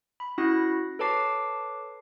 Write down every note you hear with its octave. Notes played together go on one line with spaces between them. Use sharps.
B5
C#4 E4 F#4 F#5 F#6 A#6
A4 B4 C#5 A5 D6 C7